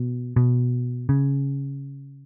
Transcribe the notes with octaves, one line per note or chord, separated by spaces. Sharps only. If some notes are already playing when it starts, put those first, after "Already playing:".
Already playing: B2
B2
C#3